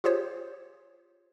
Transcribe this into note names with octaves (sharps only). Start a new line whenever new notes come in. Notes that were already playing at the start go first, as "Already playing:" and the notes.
F4 G4 G#4 C5 C#5